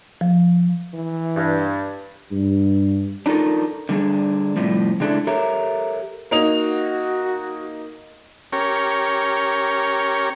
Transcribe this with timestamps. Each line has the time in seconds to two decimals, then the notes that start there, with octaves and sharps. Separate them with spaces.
0.21 F3
0.94 E3
1.35 G2
2.30 G2
3.26 D4 D#4 F4 A4 A#4
3.89 D3 G3 D4 G#4
4.56 A2 C3 F3 G3
5.00 C#3 G#3 D4 E4 A4
5.27 G4 A4 A#4 C#5 E5
6.31 A#3 D#4 F#4 F7
8.52 C#4 G4 A#4 C#5